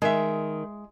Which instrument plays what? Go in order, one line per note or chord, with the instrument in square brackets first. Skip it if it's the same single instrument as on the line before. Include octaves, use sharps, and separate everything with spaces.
[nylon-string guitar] D#3 [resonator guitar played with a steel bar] G#3 E5